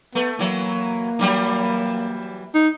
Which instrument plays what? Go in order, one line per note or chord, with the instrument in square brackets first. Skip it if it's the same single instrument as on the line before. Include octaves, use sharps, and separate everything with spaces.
[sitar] A3 [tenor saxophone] B3
[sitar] E3 F#3 [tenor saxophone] A#3
[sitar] E3 F#3 G3
[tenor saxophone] D#4